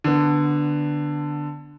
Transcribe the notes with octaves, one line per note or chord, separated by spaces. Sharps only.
D3 B3